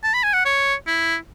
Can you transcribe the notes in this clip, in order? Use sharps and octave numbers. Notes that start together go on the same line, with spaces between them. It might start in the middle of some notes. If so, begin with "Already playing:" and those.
A5
B5
G#5
F#5
C#5
E4